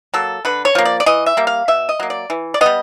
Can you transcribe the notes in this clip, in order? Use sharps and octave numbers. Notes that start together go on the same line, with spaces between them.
F#3 A#3 A4
D3 B4
C#5
F3 A#3
D5
D5
E3 D#5
E5
G3 A#3
F5
B2 E5
D#5
F#3 A#3
D5
E3
D5
G3 B3 D#5